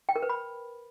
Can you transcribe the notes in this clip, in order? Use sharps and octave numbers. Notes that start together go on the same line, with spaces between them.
G5
A#4
B4
B5